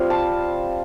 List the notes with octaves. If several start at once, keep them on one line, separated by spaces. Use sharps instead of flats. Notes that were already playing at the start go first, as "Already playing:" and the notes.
Already playing: G3 C4 F4
A5